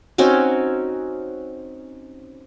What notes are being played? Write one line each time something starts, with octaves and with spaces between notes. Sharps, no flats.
C4 C#4 D#4 F#4